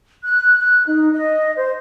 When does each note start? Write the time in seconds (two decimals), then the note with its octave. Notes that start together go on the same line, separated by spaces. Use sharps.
0.23 F#6
0.58 F#6
0.87 D#4
1.12 D#5
1.57 C5